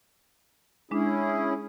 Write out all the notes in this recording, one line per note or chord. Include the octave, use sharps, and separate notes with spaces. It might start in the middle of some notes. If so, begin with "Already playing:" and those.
G#3 C#4 D4 E4 G#4